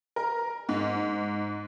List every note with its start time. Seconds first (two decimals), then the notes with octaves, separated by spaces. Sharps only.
0.16 A#4
0.69 G#2